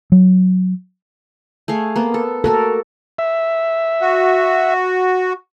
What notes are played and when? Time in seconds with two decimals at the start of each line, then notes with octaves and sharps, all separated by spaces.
0.12 F#3
1.68 A3 G#4 F5
1.96 A#3 B3
2.14 A4
2.44 A#3 F#4 A4 A#4
3.19 E5
4.01 F#4